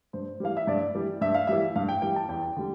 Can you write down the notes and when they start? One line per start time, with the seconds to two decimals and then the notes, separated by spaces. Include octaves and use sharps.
0.13 G2 C5
0.40 E3 G3 F5
0.57 E5
0.67 G2 D5
0.95 E3 G3
1.21 G2 E5
1.35 F5
1.47 E3 G3 E5
1.76 G2 F5
1.89 G5
2.02 E3 G3 G5
2.16 A5
2.28 E2 G5
2.57 D3 G3